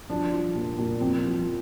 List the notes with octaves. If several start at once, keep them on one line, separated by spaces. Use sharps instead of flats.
F3 D4
F3
A#2
A#2
F3 C4
F3